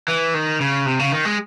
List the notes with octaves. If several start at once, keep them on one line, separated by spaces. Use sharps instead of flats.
E3
D#3
C#3
C3
C#3
D#3
G#3